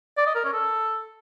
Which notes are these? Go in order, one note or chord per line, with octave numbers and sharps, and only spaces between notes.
D5
D#5
A#4
C#4
A4